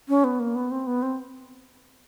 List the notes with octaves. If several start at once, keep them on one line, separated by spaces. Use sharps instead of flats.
C#4
B3
A#3
B3
C4
B3
C4